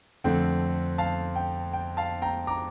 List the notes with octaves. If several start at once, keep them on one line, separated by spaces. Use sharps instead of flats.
F2 D3 A3 C4 G5
F5 A5
G5
G5
F5 A5
G5 A#5
A#5 D6